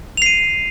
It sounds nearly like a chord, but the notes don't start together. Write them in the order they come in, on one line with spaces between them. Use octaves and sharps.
F7 C7 D#7